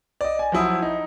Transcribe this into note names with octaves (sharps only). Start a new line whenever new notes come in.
D5 D#5
G#5
F3 F#3 E4 D#6
D#4